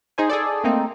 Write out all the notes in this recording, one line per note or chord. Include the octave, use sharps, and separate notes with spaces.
D#4 G#4 C5 G#5
G#4 A4 D5
A3 A#3 C4 D#4